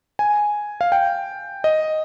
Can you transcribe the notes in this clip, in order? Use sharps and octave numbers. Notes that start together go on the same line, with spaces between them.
G#5
F5
G5
D#5